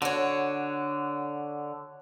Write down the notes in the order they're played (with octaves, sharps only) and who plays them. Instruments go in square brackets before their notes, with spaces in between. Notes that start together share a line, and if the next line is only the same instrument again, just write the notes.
[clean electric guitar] D3 [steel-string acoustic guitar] F#4 C#5